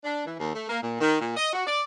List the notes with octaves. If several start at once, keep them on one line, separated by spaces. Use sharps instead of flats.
D4
E3
D#2
A3
A#3
A#2
D#3
A#2
D#5
F#4
D5